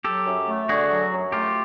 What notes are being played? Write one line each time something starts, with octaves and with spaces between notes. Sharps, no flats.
F#3 G4 A4
F#2
A3
D3 F#4 G#4
F#3
F#2
A3 F4 G4